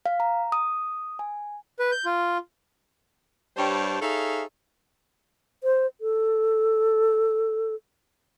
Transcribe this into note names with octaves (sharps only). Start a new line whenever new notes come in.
F5
A#5
D#6
G#5
B4
G6
F4
G2 G3 C5 C#5 G5 A5
D#4 G#4 A4 C#5 E5 F5
C5
A4